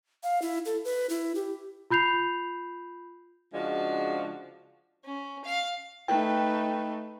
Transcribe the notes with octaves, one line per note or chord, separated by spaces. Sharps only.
F5
E4
A4
B4
E4
G4
F4 B5 G6 C7 F7
C#3 F3 G#3 D4 F#4
C#4
F5
A3 D#4 B4 G5